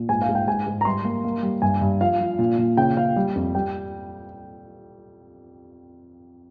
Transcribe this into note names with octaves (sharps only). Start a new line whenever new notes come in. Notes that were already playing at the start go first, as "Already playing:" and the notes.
Already playing: A#2
G#2 G#5
F5
G#2
G5
G#2 G#5
G#2
A#5
G3 C6
A#3
A#3
G3
G2 G#5
G2
F3 F5
F3
A#2
A#2
C#3 G5
C#3 F5
G3
F2
G3 G5